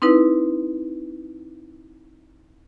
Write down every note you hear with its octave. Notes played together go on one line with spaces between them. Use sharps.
C4 D#4 E4 B4